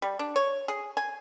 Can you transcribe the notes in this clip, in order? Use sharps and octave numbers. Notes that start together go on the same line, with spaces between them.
G3
D4
C#5
G#4
G#5